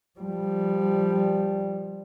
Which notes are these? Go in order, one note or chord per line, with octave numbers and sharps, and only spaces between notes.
F3 G3